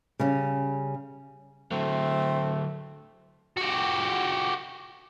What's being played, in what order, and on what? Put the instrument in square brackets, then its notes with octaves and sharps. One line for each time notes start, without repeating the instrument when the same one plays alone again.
[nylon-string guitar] C#3 G3 C#4
[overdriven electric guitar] D3 F#3 [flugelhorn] A3 [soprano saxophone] C4
[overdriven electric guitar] F#4 G4